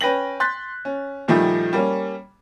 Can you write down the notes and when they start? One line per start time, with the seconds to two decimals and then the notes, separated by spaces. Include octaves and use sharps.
0.01 C#4 B4 G5 A#6 F#7
0.40 C6 F#6 G6 A6 B6
0.85 C#4
1.28 A#2 D#3 F3 G3 A3
1.73 G3 A#3 C#4